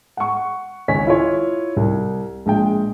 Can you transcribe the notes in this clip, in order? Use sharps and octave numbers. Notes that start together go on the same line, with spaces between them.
F#5 C#6
G#1 C#2 C#5 G#5 B6
E4 F4 C#5
C2
A#1 G#3 G5